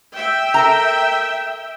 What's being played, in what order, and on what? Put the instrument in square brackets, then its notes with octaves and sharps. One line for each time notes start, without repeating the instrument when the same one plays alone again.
[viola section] E5 G5
[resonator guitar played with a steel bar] A4 A#4 A#5